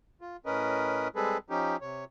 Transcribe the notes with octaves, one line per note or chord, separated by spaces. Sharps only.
F4
A2 C#4 A#4 B4 D#5
G3 G#3 C4 G#4 A4 B4
F3 C#4 D#4 G4
C3 C#5